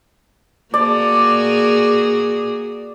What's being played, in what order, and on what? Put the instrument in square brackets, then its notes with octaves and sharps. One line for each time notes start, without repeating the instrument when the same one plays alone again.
[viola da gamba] A#3 F#4 G#4 [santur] D5